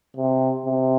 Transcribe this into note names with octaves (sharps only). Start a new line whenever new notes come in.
C3
C3